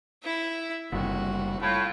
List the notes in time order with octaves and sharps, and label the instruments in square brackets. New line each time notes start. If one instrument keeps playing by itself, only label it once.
[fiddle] E4 E5
[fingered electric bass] F#1 G3 [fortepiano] C2 [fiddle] F#4
[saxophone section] A2 [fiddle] F4